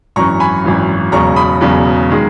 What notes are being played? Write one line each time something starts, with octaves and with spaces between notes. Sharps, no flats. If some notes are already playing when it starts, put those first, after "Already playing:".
G#1 F#2 E3 A#5 C#6
G#5 B5
G#1 F#2 E3
E1 E2 C#3 F#3 A#5 C#6
B5 D#6
E1 E2 C#3 F#3
D#3 G#3